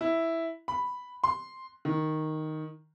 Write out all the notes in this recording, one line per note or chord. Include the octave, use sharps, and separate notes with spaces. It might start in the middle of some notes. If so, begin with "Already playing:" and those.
E4
B5
C6
D#3